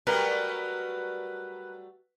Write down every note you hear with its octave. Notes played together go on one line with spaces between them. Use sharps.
F#3 G3 A3 A#4 B4